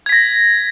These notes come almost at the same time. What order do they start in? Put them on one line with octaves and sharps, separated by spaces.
G#6 B6 A#6